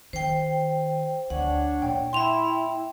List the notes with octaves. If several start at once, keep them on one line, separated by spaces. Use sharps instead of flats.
D#3 C5 G5
D2 D4 C#5 F#5
A#2 G5
E4 E5 G5 C6 F7